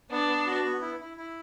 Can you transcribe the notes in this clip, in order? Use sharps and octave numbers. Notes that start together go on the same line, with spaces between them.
B3 D4
B3
F#4
B3
E4
E4
E4